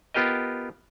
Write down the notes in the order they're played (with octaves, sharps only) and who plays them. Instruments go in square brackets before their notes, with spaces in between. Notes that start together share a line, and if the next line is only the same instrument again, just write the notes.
[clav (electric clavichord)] B3 F4 G4 A#4 D#5